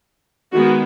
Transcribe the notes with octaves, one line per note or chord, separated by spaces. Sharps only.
D#3 G#3 B3 F#4